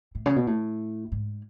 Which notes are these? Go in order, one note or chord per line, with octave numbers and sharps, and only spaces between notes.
A2
C#3
B2
A2
G#2